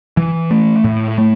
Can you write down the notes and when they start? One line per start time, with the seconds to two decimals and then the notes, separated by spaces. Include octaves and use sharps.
0.17 E3
0.51 A3
0.84 A2
1.18 A3